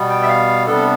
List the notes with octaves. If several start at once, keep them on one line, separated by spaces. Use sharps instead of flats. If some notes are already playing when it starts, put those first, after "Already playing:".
Already playing: B2 G3 B3
G5
E5
F5
C3 G3 B3 D4 A4